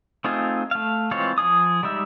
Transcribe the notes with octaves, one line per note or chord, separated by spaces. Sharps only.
A3 C4 D#4 F4 G#4
A3 F5
E3 G#3 C4 F4 C#5
F3 G#4 D#6
G3 G#3 D#4 E5